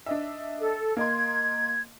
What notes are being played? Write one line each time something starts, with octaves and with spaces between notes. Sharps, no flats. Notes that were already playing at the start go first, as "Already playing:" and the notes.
D4 D#5 E5
A4
A#3 D#5 C6 G#6